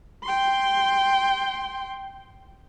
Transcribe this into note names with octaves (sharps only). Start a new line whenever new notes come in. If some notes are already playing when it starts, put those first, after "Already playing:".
G5 C6